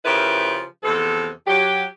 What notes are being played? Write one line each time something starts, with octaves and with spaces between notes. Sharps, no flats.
C#3 F3 E4 G4 A#4 B4
E2 C3 F3 A4
F#3 G4